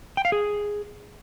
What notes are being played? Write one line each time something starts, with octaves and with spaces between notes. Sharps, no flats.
G5
F5
G#4